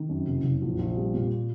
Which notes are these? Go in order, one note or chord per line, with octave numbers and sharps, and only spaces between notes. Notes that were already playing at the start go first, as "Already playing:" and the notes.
Already playing: D#3
F#2
F#1
F#1
A#1
A#1
G3
A#2